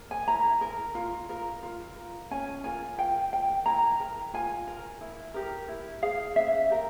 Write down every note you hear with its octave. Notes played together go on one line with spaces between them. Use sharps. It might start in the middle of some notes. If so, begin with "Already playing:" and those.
Already playing: A#4
G#5
E4 A#5
A#4
F4
A#4
F4
A#4
C#4 G#5
F4 A#4 G#5
F4 G5
A#4 G5
E4 A#5
A#4
F4 G#5
A#4
E4
G4 A#4
E4
G#4 F5
C#4 E5
G4 A#4